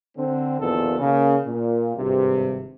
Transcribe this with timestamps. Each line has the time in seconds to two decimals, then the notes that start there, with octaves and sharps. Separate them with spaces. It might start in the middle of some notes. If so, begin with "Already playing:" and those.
0.18 D3 C4
0.60 A#1 E2 B2 D#3 F4 A4
0.99 C#3 A#3
1.47 A#2
1.96 G#1 G2 C3